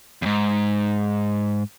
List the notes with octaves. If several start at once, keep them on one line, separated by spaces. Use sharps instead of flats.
E2 G#2